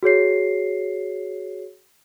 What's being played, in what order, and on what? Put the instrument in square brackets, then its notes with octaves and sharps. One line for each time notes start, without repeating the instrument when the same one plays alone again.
[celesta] F#4 G#4 C#5 C7